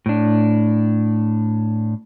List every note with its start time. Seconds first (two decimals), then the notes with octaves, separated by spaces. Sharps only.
0.06 A2 D4